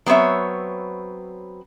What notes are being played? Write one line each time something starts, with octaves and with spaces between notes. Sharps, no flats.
F#3 B3 C4 C#5 E5